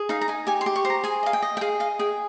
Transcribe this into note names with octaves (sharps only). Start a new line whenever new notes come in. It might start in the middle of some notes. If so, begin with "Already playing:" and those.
Already playing: G#4
D#4 F5
A#5
D#4 G#5
G4 G#5
C6
G4
C#6
C5
A#5
G#4 G#5
D#5 F5
G5
D#5
G5
G#4 F5
D#5 F5
G#4 G5